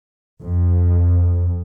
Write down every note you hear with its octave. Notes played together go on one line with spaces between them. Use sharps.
F2